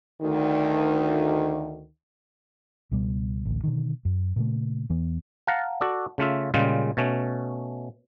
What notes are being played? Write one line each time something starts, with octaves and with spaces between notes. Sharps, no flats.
D2 D#3
C#2 B2 G3
A1 D2
B2 D3 D#3
F#2
A#2 C#3 A3
E2 E3 B3
F5 F#5 A5 A#5
F#4 A4 D5
C#3 A3 F4 E5
A#2 C#3 G3 G#3 F4
B2 A3 C#4